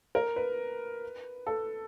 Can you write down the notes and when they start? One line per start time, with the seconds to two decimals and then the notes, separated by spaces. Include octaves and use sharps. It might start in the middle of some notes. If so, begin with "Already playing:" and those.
0.15 A#4
0.36 B4
1.47 A4